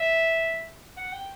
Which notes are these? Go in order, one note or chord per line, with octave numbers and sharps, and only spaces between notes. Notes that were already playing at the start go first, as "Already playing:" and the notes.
Already playing: E5
F#5
G5